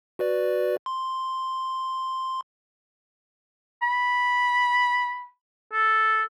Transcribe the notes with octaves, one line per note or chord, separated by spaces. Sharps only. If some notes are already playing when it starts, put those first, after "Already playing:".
F#4 B4 D5
C6
B5
A4